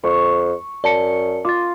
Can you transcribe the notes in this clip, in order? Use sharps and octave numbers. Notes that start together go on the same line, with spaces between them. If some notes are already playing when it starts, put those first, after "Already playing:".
F2 C#6
F#2 D5 A5 C#7
F4 D6 A6